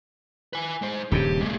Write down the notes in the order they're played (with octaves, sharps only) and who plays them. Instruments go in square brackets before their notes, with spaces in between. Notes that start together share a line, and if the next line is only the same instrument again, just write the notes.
[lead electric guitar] B4 G#5
G#3 C5
[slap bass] D#1 G2 C#3 [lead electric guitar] G4
[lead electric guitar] G#3 A#3